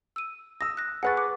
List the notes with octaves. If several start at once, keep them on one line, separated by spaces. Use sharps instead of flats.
E6 D#7
D#6 E6 A#6
F#6 A#6
G#4 B4 F#5 C#6 F#6 A6
D6